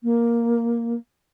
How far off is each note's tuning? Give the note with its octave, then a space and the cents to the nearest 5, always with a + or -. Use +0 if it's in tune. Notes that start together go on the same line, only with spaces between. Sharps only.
A#3 +5